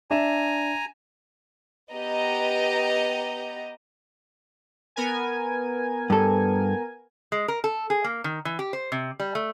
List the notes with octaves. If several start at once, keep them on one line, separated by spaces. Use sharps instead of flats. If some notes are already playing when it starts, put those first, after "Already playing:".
D4 E5 G#5 A#5 E7
B3 G4 D#5 A#5
B3 A#4 G#5
G2 A4
G#3
A#4
A4
G#4
A#3
D#3
E3
G4
C5
C3
G3
A3